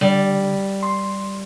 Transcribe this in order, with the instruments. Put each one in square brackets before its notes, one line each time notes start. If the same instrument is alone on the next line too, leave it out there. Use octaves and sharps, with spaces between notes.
[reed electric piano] D3 [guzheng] G3
[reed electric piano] C6